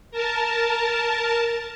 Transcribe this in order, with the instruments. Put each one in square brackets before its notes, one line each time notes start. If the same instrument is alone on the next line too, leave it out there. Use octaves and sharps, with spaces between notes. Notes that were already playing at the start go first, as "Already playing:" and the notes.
[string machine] A#4 A5